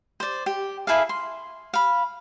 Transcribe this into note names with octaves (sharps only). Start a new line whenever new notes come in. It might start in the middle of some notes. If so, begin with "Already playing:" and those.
C5 D5
G4
E4 G#4 A4 F5
C6
F5 B5